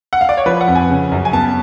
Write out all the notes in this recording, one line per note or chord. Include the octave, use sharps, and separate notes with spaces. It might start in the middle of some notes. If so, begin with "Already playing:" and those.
F#5
F5
D5
C#5
F3 B4
F#5
F2
G#5
C#3
F#2
G#5
B3 A5